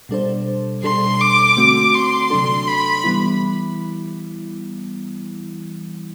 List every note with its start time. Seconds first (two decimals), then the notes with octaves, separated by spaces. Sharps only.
0.09 B2 G3 D4 A4 C5
0.83 B2 G3 D4 A4 C6
1.20 D6
1.56 D3 A3 C4 F#4
1.94 C6
2.30 C3 F#3 A3 D4 A4
2.68 B5
3.04 E3 G3 B3 E4